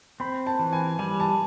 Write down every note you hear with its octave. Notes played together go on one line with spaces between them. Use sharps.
C4 B5
A5
E3
G#5
G3 G#5
A5